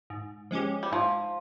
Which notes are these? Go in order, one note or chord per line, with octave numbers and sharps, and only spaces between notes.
G#2
F3 G#3 C#4 G4
G3
G#2 F3